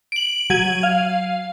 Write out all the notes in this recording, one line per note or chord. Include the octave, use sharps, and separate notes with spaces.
D7 F#7
F#3 G#6 D#7
F5